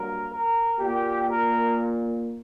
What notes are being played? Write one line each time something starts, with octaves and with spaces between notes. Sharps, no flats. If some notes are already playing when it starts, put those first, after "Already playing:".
Already playing: G2 F#3 A#3 A#4
A#4
A#2 A#3 G4
A#4